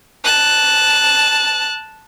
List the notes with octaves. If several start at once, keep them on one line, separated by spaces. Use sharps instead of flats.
A5 F#6